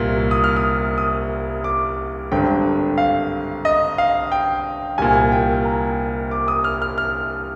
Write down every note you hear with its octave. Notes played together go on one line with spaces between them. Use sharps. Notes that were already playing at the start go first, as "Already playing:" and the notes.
Already playing: C2 A#2
D#6
F6
D#6
D#6
D6
G#1 G2 D3 G5
F5
D#5
F5
G5
C2 A#2 G#5
G5
A#5
D6
D#6
F6
F6
F6